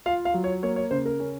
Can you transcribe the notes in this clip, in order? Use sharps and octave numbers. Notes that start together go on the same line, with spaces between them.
F4 F5
F5
F#3
C#5
A#3 C#5
C#5
C#3 C5
A#4
C#4